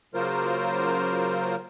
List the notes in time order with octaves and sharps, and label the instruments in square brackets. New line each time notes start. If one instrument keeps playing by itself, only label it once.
[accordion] C#3 F#3 A#3 F4 A#4 C5